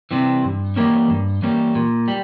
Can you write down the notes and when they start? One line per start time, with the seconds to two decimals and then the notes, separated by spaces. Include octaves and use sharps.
0.11 C3 E3 G3 C4
0.44 G2
0.76 E3 G3 A#3 C#4
1.10 G2
1.42 E3 G3 A#3 C#4
1.75 A#2
2.08 G3